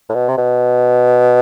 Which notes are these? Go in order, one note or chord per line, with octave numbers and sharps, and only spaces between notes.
A2
B2
C3
B2